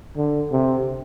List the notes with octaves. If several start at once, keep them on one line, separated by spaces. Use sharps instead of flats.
D3
C3